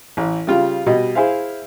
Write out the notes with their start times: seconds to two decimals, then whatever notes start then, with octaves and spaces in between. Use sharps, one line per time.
0.17 A1
0.47 C#3 G3 F4
0.86 B2 G3 D#5
1.15 E4 G#4 C5 E5 F5